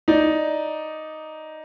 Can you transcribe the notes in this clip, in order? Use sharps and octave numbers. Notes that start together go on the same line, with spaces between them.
D#4 D5